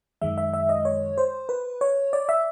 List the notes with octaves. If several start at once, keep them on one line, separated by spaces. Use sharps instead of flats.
F#2 D#3 G#3 E5
E5
E5
D#5
C#5
C5
B4
C#5
D5
E5